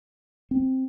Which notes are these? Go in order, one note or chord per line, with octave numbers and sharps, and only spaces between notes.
C4